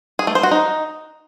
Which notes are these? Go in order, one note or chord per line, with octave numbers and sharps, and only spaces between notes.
G#4
A3
C5
F#4
D#4